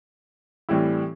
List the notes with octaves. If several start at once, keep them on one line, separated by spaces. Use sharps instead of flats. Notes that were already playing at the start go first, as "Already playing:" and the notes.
A2 E3 G3 C4 E4